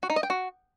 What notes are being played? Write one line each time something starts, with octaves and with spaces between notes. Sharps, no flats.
F#4
D#4
D#5
G5
F#4